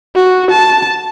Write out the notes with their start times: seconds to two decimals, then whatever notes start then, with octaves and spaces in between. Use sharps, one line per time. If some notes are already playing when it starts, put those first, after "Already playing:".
0.15 F#4
0.51 A5